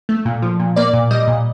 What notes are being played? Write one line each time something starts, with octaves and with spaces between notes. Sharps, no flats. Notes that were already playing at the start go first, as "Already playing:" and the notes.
A3
A#2
F3
A#2
A#3 D5
A#2
G3 D#5
A#2